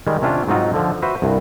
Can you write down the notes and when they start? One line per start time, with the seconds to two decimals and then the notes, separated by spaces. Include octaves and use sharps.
0.07 D#3 G3 G#3
0.22 C3 C#4 D4 F4 G4
0.48 G#2 F#3 C4 D#4 F4 F#4
0.74 D3 F3
1.02 F#4 B4 C5 E5
1.22 C2 G2